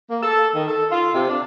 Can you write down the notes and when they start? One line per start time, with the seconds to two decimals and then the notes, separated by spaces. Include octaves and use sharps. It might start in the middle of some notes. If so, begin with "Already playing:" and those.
0.09 A#3
0.22 A4
0.54 D#3
0.68 A4
0.91 F4
1.13 C3
1.29 D4